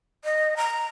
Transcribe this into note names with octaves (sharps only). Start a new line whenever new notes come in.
D#5
A#5